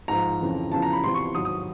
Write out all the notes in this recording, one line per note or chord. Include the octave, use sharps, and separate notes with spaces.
G#2 F3 A#5
F2 C#3 E3
E2 C#3 F3 A5
A#5
B5
E2 C3 F3 C6
C#6
G#2 D#3 F#3 D#6
D#6